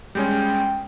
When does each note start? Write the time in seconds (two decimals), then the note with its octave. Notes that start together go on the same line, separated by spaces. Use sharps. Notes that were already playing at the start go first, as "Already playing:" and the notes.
0.15 G3 G#3 C#4 G5